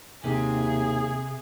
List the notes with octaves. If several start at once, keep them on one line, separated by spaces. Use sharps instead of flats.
D#2 C3 G#4